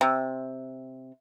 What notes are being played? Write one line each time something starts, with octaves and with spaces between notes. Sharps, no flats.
C3